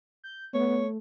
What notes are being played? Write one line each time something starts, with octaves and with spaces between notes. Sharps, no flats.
G6
A3 B3 C#5